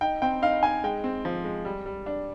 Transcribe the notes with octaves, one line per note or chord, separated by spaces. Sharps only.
D#4 G5
C4 G5
D#4 F5
D#4 G#5
G#3 G5
C4
F3
G#3
G3
G3
D4